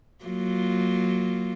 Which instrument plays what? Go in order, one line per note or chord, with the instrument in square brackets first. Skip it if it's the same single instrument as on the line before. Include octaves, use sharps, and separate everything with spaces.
[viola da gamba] F#3 A#3 F4